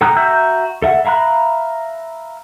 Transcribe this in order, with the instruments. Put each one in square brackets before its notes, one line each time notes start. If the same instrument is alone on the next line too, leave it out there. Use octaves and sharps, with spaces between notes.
[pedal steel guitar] A4 G5 A#5 D#6 F#6
F#4 E5 A#5 E6 G6
A4 E5 F#5
E5 F5 A#5 B5 F#6